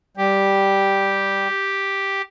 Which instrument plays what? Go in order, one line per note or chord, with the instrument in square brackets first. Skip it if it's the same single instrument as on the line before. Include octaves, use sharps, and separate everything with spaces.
[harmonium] G3 [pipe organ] G4